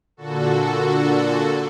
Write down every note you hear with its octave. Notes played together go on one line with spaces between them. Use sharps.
A#2 D3 F#4 A4